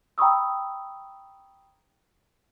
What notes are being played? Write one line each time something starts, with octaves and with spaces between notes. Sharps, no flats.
G5 A#5 B5 C#6 D#6 E6